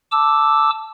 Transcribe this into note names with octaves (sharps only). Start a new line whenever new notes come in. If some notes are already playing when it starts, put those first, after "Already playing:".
A5 D6 E6